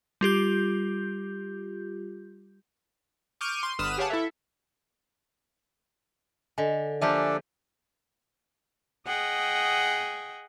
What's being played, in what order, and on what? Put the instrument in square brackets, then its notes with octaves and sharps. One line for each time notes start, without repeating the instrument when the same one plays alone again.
[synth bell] G3 F4 G4 G6
[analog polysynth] C#6 D6 F6 G6 D#7
C6
G1 D3 B4 D#6 F6 E7
G4 G#4 C#5 F5 F#5 A5
E4 A4 E5
[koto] D3 [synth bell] D#5 G#5
[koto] F3 A#3 G4 [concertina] D4 A4 D5 [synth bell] E5 G#5
[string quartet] G#4 D#5 F#5 G5